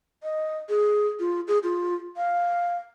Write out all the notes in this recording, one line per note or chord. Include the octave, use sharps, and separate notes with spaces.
D#5
G#4
F4
G#4
F4
F5